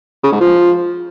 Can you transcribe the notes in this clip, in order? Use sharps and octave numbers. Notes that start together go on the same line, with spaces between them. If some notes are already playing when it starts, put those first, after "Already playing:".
C#3
G#2
F3